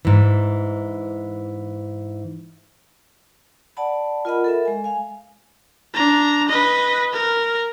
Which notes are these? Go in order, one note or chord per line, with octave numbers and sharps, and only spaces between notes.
G#2 E3
D5 F#5 A5 B5
F4 A#4 D#5 F#5 B5
A4 A#4 E5
G#3 G#5
F5 G#5
D4 A#5
B4 D#5
A#4